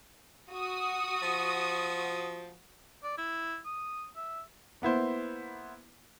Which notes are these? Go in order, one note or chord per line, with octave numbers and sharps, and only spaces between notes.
F#4 D#6
F3
D5
E4
D#6
E5
A#3 B3 E4 C5